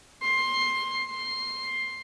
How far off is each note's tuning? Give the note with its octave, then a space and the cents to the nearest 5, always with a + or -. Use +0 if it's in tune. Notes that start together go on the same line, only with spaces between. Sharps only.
C6 +15
C6 +10